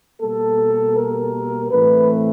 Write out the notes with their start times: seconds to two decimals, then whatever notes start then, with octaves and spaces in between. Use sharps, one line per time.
0.21 B2 G3 A#3 A4
0.96 A#4
1.70 A2 E3 A3 C4 B4